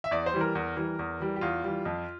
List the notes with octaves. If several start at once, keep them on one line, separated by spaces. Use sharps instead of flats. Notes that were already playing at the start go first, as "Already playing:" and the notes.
E5
E2 D5
C5
E3 G3
A#4
E2
E3 G3
E2
E3 G3
G4
E2 F4
E3 G3
F2